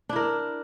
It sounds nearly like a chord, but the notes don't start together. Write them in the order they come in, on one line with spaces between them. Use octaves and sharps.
D4 E4 A#4